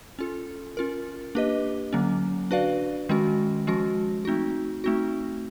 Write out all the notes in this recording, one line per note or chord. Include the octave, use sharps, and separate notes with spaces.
C#4 F4 A4
C#4 F4 A#4
A#3 D4 G4 B4 D#5
D3 F#3 A#3 C#4
D4 F#4 B4 D5 F5
D#3 G#3 C#4 F#4
F3 G#3 C#4 F#4
A3 C4 D#4 F#4
A3 C4 D#4 F#4